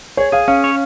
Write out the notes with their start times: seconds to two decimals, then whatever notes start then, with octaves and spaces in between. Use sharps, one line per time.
0.17 G#4 C#5
0.32 G#4 F5
0.48 C#4 F5
0.64 C#5